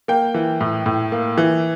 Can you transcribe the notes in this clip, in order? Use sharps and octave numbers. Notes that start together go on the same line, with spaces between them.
A#3 G5
E3
A2
A2
A#3
E3